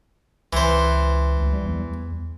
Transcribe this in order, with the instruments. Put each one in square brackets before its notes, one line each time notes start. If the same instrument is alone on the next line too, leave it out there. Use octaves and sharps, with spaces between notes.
[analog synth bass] C#2 [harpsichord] E3 C5
[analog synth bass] D2
G3
E2